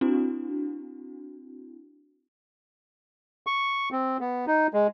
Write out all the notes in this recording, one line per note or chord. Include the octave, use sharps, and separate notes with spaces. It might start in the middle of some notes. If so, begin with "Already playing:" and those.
C4 D4 E4 F#4
C#6
C4
B3
D#4
G#3